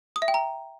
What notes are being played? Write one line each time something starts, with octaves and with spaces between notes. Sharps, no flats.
D#6
E5
G5
A#5